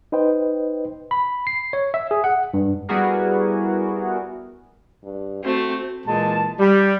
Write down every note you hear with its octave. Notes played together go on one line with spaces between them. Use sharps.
D#4 B4 C5 D#5 G5
B5
C7
C#5
E5
G#4
F#5
G2
G3 B3 E4 F#4 G#4 A#4
G2
A3 C4 F#4
A#2 E3 G#3 A5
G3